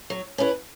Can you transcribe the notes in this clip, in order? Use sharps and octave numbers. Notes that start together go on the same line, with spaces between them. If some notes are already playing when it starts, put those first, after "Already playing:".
F#3
C#4 E4 B4